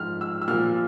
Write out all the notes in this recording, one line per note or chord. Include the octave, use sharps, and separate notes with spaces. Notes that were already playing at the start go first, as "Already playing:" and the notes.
Already playing: G#2 F3 F6
E6
E6
A#2 F3 F6